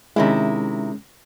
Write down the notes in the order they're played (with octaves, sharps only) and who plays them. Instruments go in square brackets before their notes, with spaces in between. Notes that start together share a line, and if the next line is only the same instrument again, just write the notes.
[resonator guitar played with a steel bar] C3 D#3 E4 [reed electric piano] G#3 C#4